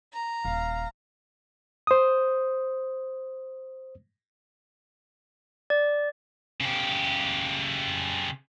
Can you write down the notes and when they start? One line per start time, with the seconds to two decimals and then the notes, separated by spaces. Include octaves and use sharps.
0.13 A#5
0.45 D#1 F5
1.87 C5 D#6
5.70 D5
6.60 C#3 G4